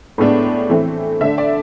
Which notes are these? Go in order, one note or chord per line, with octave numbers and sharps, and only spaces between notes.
A2 G#3 B3 D4
E3 A3 C4
D3 A3 D4 E5
D5